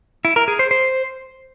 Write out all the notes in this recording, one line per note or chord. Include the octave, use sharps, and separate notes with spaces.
E4
A#4
G#4
C5
C5